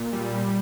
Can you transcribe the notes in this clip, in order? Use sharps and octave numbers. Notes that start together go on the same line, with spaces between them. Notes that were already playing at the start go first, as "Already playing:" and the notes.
Already playing: A#2
G3